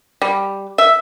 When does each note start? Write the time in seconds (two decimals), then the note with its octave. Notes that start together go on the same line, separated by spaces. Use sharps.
0.22 G3
0.78 E5